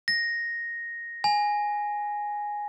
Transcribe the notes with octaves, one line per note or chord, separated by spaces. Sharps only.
A#6
G#5